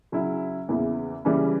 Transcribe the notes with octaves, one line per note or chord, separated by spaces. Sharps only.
C#3 F#3 C#4 E4
E2 C#3 E3 A#3 E4
C#3 E3 G3 A#3 C#4